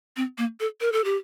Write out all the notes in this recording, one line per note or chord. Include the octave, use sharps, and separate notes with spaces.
C4
A#3
A4
A#4
A4
G4